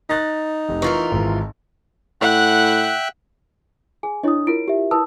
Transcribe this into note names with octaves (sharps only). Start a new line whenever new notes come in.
D#4 F#6 A6 A#6
F1
E3 F4 A#4 C#6
G#1 G#2
A2 E5 F#5 G5 F#6
G#4 G#5
D4 E4 C#5 D#5 D#6
E4 F4 A#4 D7
G4 E5
E4 B4 A5 D#6 E6